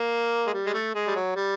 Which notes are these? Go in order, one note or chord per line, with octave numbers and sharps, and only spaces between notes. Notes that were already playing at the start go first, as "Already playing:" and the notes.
Already playing: A#3
G#3
G3
G#3
A3
G#3
G3
F#3
G3